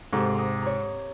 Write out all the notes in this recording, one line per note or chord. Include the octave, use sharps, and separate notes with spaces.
G#2 C3 A4 D6
A#5 D6 D#6
C#5 A#5